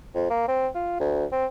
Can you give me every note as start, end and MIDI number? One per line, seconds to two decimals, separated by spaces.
0.15 0.25 41
0.30 0.46 58
0.48 0.67 60
0.75 0.98 65
1.00 1.25 38
1.32 1.46 60